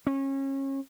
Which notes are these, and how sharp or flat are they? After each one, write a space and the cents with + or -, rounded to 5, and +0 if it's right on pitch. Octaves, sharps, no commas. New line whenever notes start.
C#4 -30